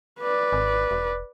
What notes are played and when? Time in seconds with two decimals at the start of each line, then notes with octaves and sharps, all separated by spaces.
0.20 B4 D5
0.53 G#1
0.91 E1